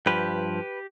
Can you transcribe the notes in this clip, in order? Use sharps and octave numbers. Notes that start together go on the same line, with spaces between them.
G2 F3 G4 B4